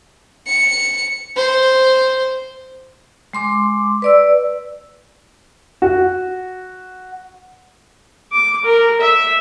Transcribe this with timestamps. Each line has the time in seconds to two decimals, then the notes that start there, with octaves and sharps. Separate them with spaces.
0.48 C#7
1.37 C5
3.33 G#3 C6 D6
4.02 B4 D5 E6
5.82 F#4
8.32 D6
8.64 A#4
9.01 E5